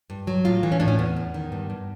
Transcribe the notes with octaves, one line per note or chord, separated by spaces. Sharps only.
G2
F#3
A2 F4
E3
C#4
A2 D4
C#4
E2 B3
E2
D#3
G2
G2